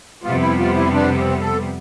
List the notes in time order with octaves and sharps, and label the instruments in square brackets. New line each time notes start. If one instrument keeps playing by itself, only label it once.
[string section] F2 C3 G3 B3 [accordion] F4
[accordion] E4
F4
E4
D4
C4
A4